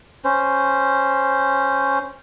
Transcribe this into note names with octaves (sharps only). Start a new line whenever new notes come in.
C#4 C5